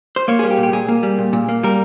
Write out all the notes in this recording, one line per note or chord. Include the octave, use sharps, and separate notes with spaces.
C5
A#3 C#5
G3 G#4
G4
A#2
G4
A#2 G#4
A#3
G3
A#2
A#2
A#3
G3 A#4